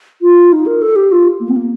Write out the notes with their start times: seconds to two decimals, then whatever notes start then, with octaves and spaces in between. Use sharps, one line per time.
0.22 F4
0.52 D#4
0.66 A#4
0.82 A4
0.96 G4
1.12 F4
1.40 A#3
1.49 C4
1.56 A#3